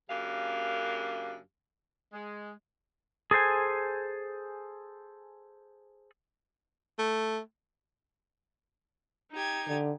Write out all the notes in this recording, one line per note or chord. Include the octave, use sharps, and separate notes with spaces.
F#2 C#3 A#3 D4 G4 F5
G#3
G#4 A4 C5 G#5
A3
D#4 G4 G#6
D3